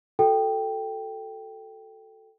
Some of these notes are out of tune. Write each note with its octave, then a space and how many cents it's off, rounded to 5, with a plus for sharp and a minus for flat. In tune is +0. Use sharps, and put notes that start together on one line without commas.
F#4 +0 A4 +0 G5 +0